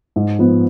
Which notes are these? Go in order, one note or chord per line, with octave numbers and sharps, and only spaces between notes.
G#2
F3 B3